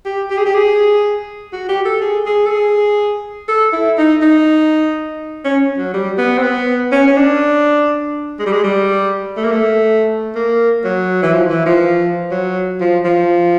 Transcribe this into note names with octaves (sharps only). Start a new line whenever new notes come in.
G4
G4
G#4
G4
G#4
F#4
G4
A4
G#4
G#4
A4
G#4
A4
E4
D#4
D#4
C#4
F#3
G3
B3
C4
B3
C#4
C#4
D4
G#3
G3
G#3
G3
A3
A#3
A3
A#3
F#3
E3
F3
E3
F3
F#3
F3
F3